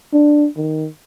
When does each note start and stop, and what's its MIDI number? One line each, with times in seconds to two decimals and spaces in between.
0.13 0.47 62
0.57 0.87 51